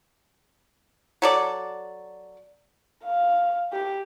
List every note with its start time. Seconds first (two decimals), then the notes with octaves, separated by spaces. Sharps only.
1.22 F#3 A4 D5
3.04 F5
3.72 G4